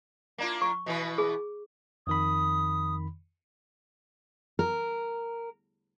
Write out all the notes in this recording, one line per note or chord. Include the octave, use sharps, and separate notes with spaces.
A#3 D4 F4
C#6
B2 E3 B4
G#4
F2 D#3 B5 D#6
A#4